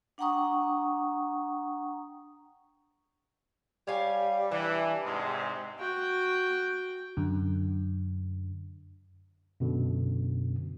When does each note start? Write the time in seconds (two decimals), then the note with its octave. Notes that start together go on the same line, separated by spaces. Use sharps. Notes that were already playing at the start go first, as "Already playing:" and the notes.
0.18 D4 F#5 G5 A#5 C#6 D#6
3.87 G3 C#5 F5 G#5
4.52 E3 D4
5.05 G#2 C3 G#3
5.79 F#4 G5
7.17 F#2 D3
9.60 F#2 B2 D3